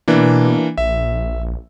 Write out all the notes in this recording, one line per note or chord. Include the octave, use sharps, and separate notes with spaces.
B2 E3 A#3 D4
A#1 E5